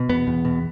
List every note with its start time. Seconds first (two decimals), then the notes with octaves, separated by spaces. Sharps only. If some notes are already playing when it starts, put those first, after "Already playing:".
Already playing: B2
0.09 E2 B3
0.27 E2
0.45 B2